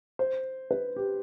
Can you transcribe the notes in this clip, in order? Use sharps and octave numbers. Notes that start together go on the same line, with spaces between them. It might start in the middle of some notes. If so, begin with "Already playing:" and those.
C5
B4
G4